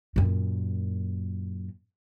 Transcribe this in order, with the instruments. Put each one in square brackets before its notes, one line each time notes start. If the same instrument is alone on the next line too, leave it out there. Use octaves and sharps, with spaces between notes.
[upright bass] F#2 A#2